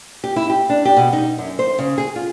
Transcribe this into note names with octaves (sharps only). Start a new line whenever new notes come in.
G4
E4
G4
D4
G4
B2
D#4
F#2
C5
C#3
G#4
F4